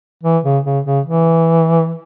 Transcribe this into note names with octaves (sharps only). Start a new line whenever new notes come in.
E3
C#3
C#3
C#3
E3